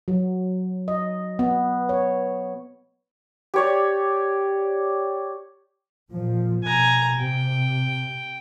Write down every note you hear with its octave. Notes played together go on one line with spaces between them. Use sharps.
F#3
D#5
B3
C#5
G4 C#5 D5
A#2 F3
B2 G#5 A#5
C3 G5